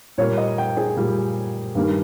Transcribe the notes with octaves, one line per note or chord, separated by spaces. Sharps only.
A#2 G3 A#3 C#5
D#5
G5
G#4
A#2 G3 A#3
G2 D#3 G3 A#3